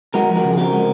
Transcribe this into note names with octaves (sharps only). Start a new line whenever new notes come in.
G#3 F#4 A#4
F3
F#4 A#4
C#3
G#4
C4 F#4 A#4
G#3